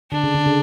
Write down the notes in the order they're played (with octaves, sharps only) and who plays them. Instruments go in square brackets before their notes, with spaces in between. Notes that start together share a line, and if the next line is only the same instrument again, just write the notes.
[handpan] D3 [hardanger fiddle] D4
[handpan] C#3
D3
C#3